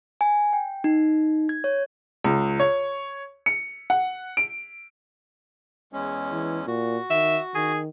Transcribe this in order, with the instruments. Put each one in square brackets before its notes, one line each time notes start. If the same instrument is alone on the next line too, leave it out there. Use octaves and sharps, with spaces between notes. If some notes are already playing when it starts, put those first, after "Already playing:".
[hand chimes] G#5
G5
D#4
G#6
C#5
[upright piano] C#2
C#5
C#7
F#5
D7
[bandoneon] E2 G#3 C#4
[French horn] E3
[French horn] A#2 [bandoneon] F#4
[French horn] D#3 [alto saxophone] E5
[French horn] D#3 [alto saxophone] G#4